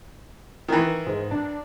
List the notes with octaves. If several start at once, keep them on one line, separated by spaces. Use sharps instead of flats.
D#3 E3
G#2
D4